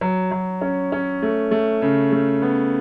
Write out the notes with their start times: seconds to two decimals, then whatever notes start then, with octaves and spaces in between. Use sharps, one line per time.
0.01 F#3
0.31 F#3
0.61 C#4
0.92 C#4
1.22 A3
1.51 A3
1.82 C#3
2.12 A3
2.42 B3